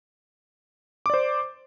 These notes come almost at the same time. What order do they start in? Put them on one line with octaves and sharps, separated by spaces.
D6 D5 C5